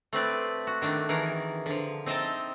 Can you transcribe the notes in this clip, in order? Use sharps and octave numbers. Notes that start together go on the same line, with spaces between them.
A3 C4 B4 D5
F#4
D#3 A3 D4
D#3 E3 G#4 A#4
D3 F3
C4 D#4 D#5 E5 G5 A5